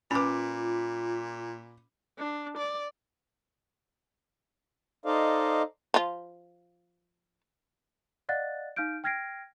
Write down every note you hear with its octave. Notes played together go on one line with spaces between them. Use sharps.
A#2 C#4 F4 B4 B5 D6
D4
D5
D#4 A4 C5 D5 D#5 F5
F3 F4
D5 D#5 F5 F#5 F#6 A6
D#4 F5 F6 G6 D7
G5 F6 G#6 A#6 C7 D7